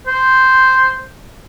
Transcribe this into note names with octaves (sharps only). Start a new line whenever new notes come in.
C5